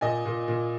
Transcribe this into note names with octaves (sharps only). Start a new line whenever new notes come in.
A#2 D#5 G#5
A#2
A#2